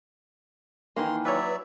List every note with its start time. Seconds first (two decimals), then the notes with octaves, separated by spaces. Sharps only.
0.96 D#3 E3 A#3 C6
1.25 F#3 B4 C#5 D5 E5